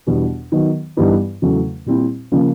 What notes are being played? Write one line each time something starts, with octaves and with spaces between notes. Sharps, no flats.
E2 B2 G3 B3 D4
D#3 F#3 B3
G2 E3 G3 B3 D#4
E2 C#3 F#3 A3 C#4
A#2 G3 C4 E4
C#3 F3 A#3 C#4